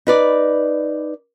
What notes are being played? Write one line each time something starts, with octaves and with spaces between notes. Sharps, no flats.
D#4 B4 D5